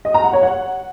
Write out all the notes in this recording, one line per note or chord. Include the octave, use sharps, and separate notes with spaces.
D#5
A#5
F#5
C#5
F#5